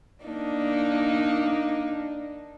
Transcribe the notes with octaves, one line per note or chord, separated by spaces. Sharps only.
A#3 D4 D#4